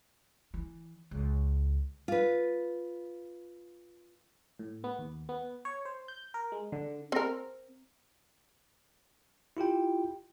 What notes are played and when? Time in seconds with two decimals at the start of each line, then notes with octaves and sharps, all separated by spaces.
0.54 E3
1.11 C#2
2.08 F4 B4
4.59 A2
4.84 B3
4.99 D#2
5.29 B3
5.65 C#5
5.85 C5
6.08 G6
6.34 A#4
6.52 G#3
6.72 D3
7.12 C4 A#4
9.57 E4 F4 G4 G5